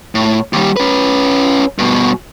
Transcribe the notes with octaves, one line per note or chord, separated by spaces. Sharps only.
A2
D#2 G3
C#4 B4
G2 B2